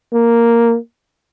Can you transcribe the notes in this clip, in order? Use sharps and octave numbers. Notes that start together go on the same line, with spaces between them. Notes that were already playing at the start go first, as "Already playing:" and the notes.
A#3